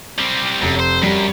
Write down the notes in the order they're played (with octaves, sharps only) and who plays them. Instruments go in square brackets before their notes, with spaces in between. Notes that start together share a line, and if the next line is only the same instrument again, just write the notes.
[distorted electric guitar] G3 C4
[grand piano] F1 [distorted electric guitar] F#2
[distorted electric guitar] C5
[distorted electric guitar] F#2 [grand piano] G3